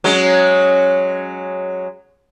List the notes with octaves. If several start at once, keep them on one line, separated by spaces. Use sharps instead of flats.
F#3 G#3 C#4